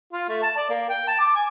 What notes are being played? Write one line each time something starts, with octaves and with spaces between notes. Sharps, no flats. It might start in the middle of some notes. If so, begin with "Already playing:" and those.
F4
A3
A5
D5
A#3
G5
A5
D6
G#5